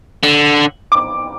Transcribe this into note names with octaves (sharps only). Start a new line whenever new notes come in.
D3
D6